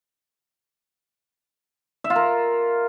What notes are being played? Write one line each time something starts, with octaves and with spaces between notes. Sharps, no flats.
E5
F4
A#4